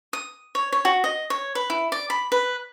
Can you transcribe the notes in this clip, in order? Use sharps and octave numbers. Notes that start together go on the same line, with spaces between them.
D#6
C#5
C#5
F#4
D#5
C#5
B4
E4
D5
B5
B4